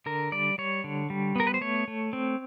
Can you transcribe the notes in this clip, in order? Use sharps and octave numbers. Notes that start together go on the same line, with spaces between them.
D3 A#4
G3 D5
G3 C#5
D3
G3
B3 A#4
B4
C5
A3 C#5
A3
C4